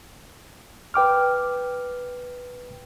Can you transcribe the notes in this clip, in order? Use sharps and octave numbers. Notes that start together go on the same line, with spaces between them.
B4 G5 D6 F6